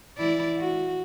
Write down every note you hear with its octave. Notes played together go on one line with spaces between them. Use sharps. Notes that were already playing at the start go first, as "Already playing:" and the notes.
E3 E4 D5
F#4